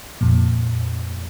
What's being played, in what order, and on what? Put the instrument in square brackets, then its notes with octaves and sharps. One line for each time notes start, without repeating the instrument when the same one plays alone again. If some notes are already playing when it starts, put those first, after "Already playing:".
[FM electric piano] F2 A#2